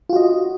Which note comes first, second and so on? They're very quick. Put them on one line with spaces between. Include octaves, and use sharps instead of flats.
F4 F#4 D#5